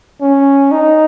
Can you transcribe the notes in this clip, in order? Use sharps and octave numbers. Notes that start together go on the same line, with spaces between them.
C#4
D#4